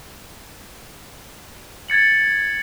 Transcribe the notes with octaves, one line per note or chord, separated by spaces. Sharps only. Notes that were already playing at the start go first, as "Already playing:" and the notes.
G#6 A6 C#7 F#7